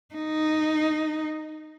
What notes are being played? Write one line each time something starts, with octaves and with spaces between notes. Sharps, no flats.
D#4